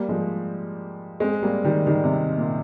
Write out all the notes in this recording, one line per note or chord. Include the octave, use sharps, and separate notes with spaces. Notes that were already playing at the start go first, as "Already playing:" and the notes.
Already playing: G3 A#3
F3 G#3
G#3 C4
G3 A#3
D#3 G3
D#3 G3
C3
A#2